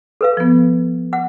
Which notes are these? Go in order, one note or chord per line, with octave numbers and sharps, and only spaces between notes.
A4 B4 F5
F3 B3
F#5